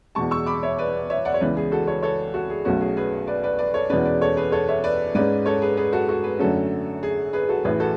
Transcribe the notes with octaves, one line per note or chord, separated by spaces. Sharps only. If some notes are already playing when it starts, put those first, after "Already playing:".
E2 B2 G#3 A5 C#6
C#6 E6
B5 D6
C#5 E5
B4 D5
C#5 E5
D5 F#5
C#5
C#2 C#3 E3 B3 B4 D5
G#4
F#4 A4
A4 C#5
A4 C#5
F#4 A4
G#4
B1 B2 A3 C#4 F#4
G#4
G#4 B4
B4 D5
B4 D5
B4 D5
A4 C#5
E2 B2 G#3 C#4 B4 D5
B4 D5
A4 C#5
G#4 B4
A4 C#5
C#5 E5
B4 D5
G#2 G#3 C#4 B4 D5
A4 C#5
G#4 B4
G#4 B4
F#4 A4
F#4 A4
G#4 B4
F#2 D3 A3 C#4 F#4 A4
G#4
G#4 B4
F#4 A4
A1 A2 E3 G#4 B4
F#4 A4